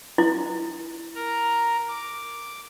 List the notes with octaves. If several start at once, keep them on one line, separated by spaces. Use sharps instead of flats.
E4
A#4 A#5
D6